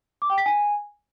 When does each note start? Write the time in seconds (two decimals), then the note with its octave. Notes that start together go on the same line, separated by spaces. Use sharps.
0.22 D6
0.30 G5
0.38 B6
0.46 G#5